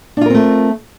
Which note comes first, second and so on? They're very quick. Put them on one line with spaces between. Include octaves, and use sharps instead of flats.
D4 F4 A#4 C4 A3